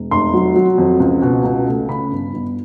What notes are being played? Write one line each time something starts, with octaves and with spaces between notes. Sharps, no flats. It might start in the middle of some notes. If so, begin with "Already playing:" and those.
Already playing: E1
F1 C6
F#3
F#3
F2
C#2
B2
C#2
A3
C#3 B5
G1
G1